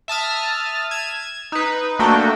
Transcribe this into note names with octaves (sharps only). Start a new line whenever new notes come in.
E5 A5 D#6 F6
G#6 E7
D#4 B4
A3 A#3 D4 F#4 A4 G5